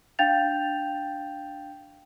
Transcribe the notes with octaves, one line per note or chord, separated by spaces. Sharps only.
D4 F5 G5 G6 A6 F7